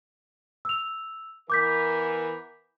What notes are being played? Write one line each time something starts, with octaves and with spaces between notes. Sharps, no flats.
E6 F7
E3 B3 A#4 D6 G6 B6